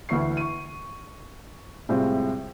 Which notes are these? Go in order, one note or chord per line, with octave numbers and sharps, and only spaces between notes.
D2 E3 E4 C#6 C7
C#6 D#7
A2 C3 G3 G#3 C4 F4